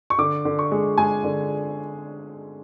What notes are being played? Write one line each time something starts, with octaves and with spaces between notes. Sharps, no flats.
C#6
D3 D6
D3
C#6
G#3
G#3 G#5
D3